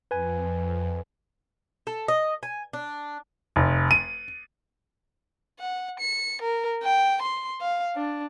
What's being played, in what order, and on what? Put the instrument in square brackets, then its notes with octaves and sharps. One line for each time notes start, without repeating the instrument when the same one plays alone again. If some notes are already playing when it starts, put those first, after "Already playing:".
[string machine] F2 [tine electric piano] B4 G#5
[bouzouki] A4
D#5
G#5
D4
[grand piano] F1
D#7
[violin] F#5
C#7
A#4
G5
C6
F5
D4